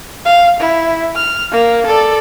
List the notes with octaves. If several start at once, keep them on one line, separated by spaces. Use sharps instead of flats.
F5
E4
F6
A#3
A4 D5